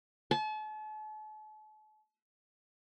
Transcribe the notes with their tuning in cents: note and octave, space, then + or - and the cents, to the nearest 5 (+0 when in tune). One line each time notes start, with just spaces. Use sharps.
A5 -40